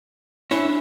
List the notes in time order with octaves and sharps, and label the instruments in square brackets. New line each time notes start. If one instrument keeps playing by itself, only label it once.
[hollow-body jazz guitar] C#4 E4 [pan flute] D4